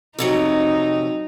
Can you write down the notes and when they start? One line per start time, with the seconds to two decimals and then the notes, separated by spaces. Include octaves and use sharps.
0.19 F2 C3 F#3 D#4